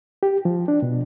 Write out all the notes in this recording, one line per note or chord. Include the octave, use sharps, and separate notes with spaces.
G4
F3
D4
B2